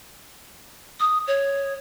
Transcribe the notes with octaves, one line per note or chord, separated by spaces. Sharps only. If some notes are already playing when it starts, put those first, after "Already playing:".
D#6
C#5